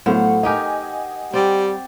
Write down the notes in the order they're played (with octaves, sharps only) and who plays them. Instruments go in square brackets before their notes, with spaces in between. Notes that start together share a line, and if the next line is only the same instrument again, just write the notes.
[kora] A2 C5 F5 [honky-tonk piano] F#3 A3 B3 [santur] F#5
[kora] D#4 G4 A#4 [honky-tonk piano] D#5 G#5
[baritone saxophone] G3 [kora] C4 D5